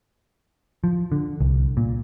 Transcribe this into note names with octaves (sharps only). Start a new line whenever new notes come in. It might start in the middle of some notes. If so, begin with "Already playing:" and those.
F3
D3
C2
A#2